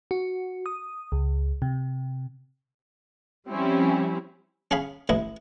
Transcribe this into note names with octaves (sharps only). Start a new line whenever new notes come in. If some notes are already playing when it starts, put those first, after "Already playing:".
F#4
D#6
C#2
C3
F3 G3 C4 C#4 E4
C#4 G#4 F5 B5
A1 E4 D#5